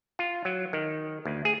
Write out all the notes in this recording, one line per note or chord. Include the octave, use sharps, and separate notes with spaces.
F4
F#3
D#3
D2
G#4